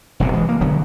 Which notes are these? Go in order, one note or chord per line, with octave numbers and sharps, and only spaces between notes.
F1 B1 E2 C3
E3 G#3
A#3
E1 D3 F#3 B3